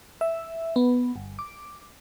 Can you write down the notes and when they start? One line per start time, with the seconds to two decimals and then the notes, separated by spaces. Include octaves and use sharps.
0.21 E5
0.76 B3
1.16 G1
1.39 D6